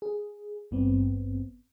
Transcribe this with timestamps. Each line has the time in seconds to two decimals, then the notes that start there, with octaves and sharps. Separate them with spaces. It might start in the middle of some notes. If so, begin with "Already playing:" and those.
0.02 G#4
0.71 G#1 G2 B3 C4